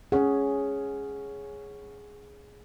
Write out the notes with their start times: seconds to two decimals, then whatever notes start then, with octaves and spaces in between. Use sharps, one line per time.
0.12 C#4 G#4 C#5 F#5